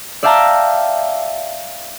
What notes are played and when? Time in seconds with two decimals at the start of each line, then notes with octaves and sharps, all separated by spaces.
0.23 D5 E5 F5 G5 A5 A#5